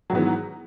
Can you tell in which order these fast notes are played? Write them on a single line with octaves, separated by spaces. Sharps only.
F#3 G#2 B3 E3